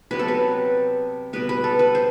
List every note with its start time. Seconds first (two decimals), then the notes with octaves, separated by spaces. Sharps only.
0.11 C3 F#3 B3 B4
0.19 A4
0.28 B4
1.33 B2 G3 B3 B4
1.49 B4
1.64 A4
1.79 B4
1.95 C5